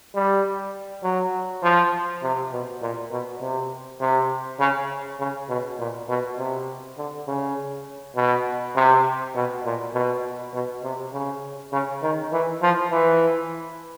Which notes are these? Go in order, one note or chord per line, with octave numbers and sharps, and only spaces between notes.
G3
F#3
F3
C3
B2
A#2
B2
C3
C3
C#3
C#3
B2
A#2
B2
C3
D3
C#3
B2
C3
B2
A#2
B2
B2
C3
C#3
C#3
D#3
E3
F3
E3